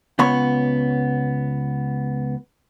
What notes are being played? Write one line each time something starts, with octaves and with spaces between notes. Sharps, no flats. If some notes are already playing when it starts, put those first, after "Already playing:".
C#2 B3 C#5 B5